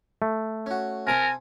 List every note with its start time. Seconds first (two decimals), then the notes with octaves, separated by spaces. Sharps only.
0.22 A3
0.66 C#4 F#4
1.07 C3 A#4 G#5 A5